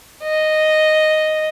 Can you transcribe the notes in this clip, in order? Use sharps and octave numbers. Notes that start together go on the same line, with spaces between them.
D#5